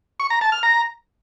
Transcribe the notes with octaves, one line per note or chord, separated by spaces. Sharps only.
C#6
A#5
A5
F6
A#5